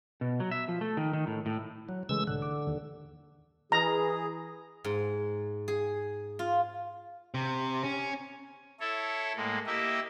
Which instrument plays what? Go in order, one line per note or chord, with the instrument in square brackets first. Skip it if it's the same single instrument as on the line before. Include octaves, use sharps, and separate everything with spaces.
[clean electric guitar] B2
F#3
E5
F3
A3
D#3
D#3
A2
A2
[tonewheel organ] F#3
[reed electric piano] C#3 G#3 A3 [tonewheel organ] E3 E6
[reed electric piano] C2 A2 F#6 [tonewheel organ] D3
[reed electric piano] D6
D#2
[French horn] E3 [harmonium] G#4 [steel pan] A#5
[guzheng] G#2
G#4
F4
[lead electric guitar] C3
C#4
[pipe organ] E4 A4 C#5
A2 G#3 A#3
A#3 E4 G4 D#5 E5